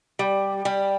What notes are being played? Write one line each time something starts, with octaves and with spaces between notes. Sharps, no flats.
G3
G3